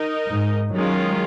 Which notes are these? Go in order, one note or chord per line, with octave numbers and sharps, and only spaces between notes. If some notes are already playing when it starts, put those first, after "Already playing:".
Already playing: D#4 A#4 D#5
G#2
D#3 F#3 G#3 C#4 F4